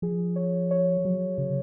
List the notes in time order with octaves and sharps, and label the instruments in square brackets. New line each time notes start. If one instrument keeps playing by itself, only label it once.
[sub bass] F3 [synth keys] G#4
[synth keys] C#5
C#5
F#3
[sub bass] C#3 [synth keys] F#3